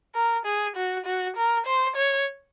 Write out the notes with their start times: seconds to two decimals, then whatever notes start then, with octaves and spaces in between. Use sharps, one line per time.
0.15 A#4
0.46 G#4
0.76 F#4
1.06 F#4
1.37 A#4
1.66 C5
1.96 C#5